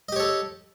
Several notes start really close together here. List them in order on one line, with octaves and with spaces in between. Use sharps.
D#5 G4 C#5 A4